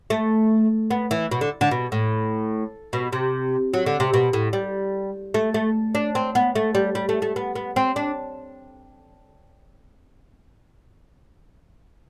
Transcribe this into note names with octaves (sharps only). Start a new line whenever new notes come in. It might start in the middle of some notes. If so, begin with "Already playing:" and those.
A3
B3
E3
B2
D3
D3
B2
A2
B2
C3
F#3
D3
C3
B2
A2
G3
A3
A3
D4
C4
B3
A3
G3
G3
A3
A3
B3
B3
C4
D4